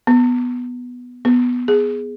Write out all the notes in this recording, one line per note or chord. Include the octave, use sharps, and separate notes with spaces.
B3
B3
G#4